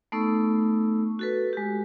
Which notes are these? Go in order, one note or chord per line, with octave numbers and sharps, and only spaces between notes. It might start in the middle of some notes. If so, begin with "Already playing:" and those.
A3 B3 D#4 A4 C#6 E6
F#4 A4 B4
G#3 G4